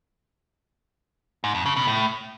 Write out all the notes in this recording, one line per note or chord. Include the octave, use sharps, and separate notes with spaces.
G#2
F2
C#3
B2
A2